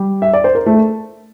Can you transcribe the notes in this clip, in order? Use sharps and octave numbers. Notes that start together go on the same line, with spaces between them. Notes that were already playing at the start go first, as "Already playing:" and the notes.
Already playing: G3 G4
E5
D5
C5
A#4
A3 A4